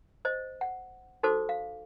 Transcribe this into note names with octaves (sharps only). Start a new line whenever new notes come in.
C5 D#5
F#5
D#4 F#4 A4 C5 D6
F5